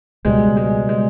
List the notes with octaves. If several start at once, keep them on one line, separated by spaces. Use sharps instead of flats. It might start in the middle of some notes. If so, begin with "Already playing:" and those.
C#2 B2 G3 G#3
G#3
G#3